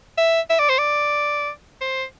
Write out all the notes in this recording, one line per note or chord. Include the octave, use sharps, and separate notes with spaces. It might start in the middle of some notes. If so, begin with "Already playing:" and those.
E5
E5
D5
C5
D5
C5